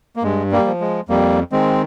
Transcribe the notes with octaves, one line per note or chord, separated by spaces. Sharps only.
A#3
G2 G#3
G3 A#3
F3
G#3
F2 G3 A#3
D#3 G#3 C4